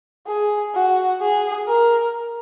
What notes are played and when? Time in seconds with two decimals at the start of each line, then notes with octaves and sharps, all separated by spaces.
0.27 G#4
0.74 F#4
1.21 G#4
1.68 A#4